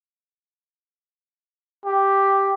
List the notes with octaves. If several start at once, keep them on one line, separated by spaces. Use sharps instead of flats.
G4